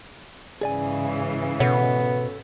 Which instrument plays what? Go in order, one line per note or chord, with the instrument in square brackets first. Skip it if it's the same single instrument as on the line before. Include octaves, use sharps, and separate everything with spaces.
[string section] G#2 C#3 E3 [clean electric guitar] G#4 D5 G#5
[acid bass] B2 [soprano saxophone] B3 [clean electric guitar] A4 C#5